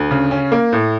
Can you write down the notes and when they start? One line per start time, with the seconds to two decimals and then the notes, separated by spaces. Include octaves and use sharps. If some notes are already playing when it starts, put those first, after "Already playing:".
Already playing: D2
0.11 C#3
0.31 C#4
0.52 A#3
0.73 A2